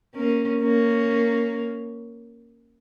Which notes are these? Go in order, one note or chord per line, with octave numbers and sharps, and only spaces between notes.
A#3 C#4
A#3 C#4